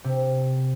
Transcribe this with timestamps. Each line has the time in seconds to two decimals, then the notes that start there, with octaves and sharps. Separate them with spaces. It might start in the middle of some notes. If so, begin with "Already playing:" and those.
0.04 C3